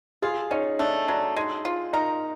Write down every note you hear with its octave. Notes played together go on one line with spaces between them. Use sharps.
F4 G#4
C#4 D#4
A3 D4
F#3 D4
G#3 D#4
F4
D#4 A#4